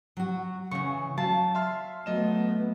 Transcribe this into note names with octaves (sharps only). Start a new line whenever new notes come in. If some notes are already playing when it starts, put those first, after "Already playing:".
F#3 F#4
C#3 E3 C#6
F#3 F5 A5
E5 C6 F6
F#3 A3 B3 D#5 E7